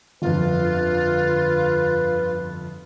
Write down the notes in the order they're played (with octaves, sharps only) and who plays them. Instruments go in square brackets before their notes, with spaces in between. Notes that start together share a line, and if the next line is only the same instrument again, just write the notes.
[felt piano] G1 F2 [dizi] F4 [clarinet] B4